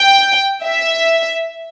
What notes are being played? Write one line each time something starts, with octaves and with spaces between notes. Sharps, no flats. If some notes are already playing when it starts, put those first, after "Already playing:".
Already playing: G5
E5